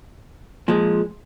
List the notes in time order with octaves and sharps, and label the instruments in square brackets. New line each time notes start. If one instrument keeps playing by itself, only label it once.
[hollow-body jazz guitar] A#2 F3 G#3